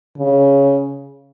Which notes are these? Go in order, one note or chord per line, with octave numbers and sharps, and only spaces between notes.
C#3